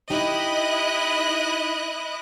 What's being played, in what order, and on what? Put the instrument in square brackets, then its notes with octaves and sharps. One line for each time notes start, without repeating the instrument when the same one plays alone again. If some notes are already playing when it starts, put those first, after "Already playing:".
[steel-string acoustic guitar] D#4 G4 [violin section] E4 D#5 F#6